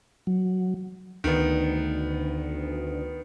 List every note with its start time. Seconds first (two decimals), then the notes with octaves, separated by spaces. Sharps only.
0.27 F#3
1.24 D2 D#3 B3